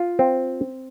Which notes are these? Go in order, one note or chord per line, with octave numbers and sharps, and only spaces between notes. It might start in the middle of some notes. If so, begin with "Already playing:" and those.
Already playing: F4
C4